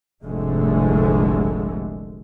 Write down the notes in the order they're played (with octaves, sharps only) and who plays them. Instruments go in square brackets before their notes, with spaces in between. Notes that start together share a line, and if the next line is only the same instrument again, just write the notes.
[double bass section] F1 C2 G#2 D3 G#3 A3